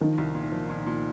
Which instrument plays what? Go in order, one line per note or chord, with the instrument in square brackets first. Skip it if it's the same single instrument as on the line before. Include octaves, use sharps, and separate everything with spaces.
[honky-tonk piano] D#3 D#4 [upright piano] F3
[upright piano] C2
A#2
F3
A#2
A#2